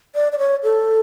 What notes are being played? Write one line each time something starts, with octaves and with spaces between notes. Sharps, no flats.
D5
D5
C#5
A4